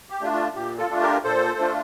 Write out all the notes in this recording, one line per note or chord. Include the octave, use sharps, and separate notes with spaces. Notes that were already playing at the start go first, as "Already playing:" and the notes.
G4
A3 D4 F4
F4
A#2 G4
F4 A4
A3 D4 F4
G4 A#4
A#2 A4 C5
A3 D4 F4